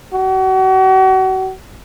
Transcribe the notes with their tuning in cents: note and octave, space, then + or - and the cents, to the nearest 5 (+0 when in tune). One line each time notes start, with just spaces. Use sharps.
F#4 +35